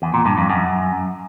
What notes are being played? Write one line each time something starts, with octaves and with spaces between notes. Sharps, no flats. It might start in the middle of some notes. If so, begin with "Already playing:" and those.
E2
A#2
G2
F2
F#2